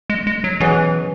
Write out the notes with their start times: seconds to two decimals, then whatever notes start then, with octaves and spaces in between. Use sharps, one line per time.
0.10 G#3
0.27 G#3
0.44 F#3
0.60 B2 E3 F#3 C#4 G#4